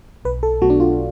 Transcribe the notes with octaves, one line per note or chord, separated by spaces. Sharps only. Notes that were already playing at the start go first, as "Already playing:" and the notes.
B1 B4
A4
B2 F#3 A3 F#4
D4
F4